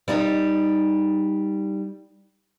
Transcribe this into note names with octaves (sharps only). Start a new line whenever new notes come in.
G3 D#4 D#5